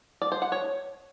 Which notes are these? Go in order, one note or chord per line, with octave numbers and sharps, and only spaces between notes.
D5
C5
F#5
C#5